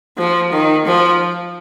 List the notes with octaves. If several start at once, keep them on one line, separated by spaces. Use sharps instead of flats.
F3
D#3
F3